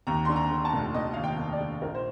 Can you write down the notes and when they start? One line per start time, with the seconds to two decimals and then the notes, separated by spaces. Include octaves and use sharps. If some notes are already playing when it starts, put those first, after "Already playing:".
0.07 D#2 A#5
0.25 D3 C6
0.36 A#5
0.51 D3
0.65 A5
0.73 F1
0.94 F1 D#5
1.14 D#2 F5
1.24 G5
1.38 F1
1.53 D5
1.60 D3
1.82 A#1 A#4
1.95 C5